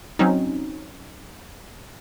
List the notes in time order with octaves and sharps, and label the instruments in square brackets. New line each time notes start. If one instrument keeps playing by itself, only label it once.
[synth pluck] F#3 C4 C#4 D#4